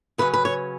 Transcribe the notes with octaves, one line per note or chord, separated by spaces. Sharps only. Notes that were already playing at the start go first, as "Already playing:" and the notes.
C#3 F#3 C#4 B4
B4
C#5